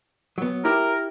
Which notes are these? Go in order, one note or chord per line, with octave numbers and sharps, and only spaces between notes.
F#3 B3
E4 G4 A#4